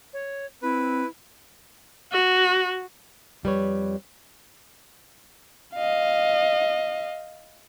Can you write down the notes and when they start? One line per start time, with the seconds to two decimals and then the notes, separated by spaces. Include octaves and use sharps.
0.13 C#5
0.62 C4 E4 B4
2.12 F#4
3.43 F2 G3 B4 C#5
5.75 D#5 F5